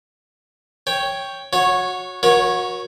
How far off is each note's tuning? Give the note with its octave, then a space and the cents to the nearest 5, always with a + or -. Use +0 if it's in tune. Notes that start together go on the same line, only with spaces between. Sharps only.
C#5 +0 G5 +0
F#4 -20 C#5 +0
F#4 -25 A#4 +40 C#5 +0